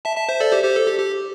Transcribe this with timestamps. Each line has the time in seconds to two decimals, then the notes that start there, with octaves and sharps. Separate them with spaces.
0.05 E5 A5
0.16 E5 A5
0.28 C5 E5
0.40 A4 D5
0.52 G4 C5
0.64 G4 C5
0.76 A4
0.87 G4
0.99 G4